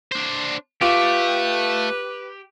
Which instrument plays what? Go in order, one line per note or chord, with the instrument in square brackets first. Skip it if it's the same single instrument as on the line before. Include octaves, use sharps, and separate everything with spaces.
[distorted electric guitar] D4 C5
[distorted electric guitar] A3 [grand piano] F4 [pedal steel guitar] G4 [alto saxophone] B4